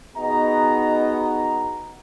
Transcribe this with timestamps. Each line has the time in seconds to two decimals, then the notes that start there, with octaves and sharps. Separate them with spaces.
0.16 B3 D#4 F#4 G#4 D#5 A#5